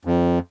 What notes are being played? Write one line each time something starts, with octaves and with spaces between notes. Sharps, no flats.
F2